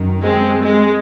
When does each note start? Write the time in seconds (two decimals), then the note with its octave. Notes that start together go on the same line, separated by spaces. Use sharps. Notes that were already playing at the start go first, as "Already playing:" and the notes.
Already playing: F#2 D#3
0.22 G#3 C4
0.62 G#3